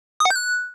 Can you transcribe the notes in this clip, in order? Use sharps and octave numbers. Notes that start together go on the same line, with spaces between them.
D#6
F#5
G6
F#6